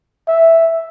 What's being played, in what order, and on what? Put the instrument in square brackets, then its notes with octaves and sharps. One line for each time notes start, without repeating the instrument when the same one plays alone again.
[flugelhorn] E5